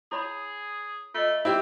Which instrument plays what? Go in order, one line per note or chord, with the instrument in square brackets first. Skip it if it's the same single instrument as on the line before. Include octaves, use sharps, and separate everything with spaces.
[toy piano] E4 C#5 B5 [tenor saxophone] G#4
[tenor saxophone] A3 [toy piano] F4 D#5
[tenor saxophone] C4 [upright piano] E4 G4